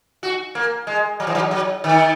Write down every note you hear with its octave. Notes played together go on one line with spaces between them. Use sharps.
F#4
A#3
G#3
F#3
E3
F#3
F#3
D#3